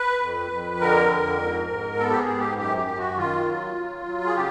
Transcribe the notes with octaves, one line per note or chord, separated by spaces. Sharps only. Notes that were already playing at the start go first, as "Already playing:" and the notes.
Already playing: B4
F2
F2
D3 A#4
F2
G#2
G#2
B3 A4
G4
G#4
G#2
G4
F#2 G4
G4
F#2
F#4
D#3 F4
F#3
F#3
F#3
G#4
C#3 G4